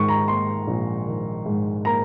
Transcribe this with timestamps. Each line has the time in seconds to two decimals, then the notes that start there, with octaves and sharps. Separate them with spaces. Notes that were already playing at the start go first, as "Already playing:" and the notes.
Already playing: G#2 D#3 C#6
0.09 A#5
0.28 A#3 C6
0.67 A#1
1.07 D#3
1.46 G#2
1.85 A#3 A#5